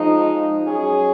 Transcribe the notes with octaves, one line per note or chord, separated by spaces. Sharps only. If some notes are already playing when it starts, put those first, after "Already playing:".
Already playing: F3 G#3 D#4
F#3 C#4 G#4